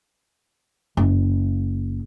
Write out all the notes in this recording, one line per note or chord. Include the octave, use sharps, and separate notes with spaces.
F#1